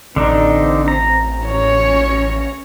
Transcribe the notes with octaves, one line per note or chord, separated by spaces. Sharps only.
A1 D3 C4 D4 D#4
A#5
C#4 C#5